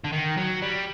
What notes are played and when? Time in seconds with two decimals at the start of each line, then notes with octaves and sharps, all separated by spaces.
0.04 D3
0.13 D#3
0.37 F#3
0.62 G3